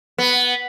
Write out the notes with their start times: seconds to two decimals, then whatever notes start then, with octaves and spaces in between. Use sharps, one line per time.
0.18 B3